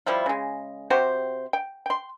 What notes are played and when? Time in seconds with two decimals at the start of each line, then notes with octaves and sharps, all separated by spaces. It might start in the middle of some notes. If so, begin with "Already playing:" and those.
0.06 F3 G3 E4 F4
0.26 C#3 G#3
0.90 C3 F#4 G4 C5
1.53 G5
1.86 G5 C6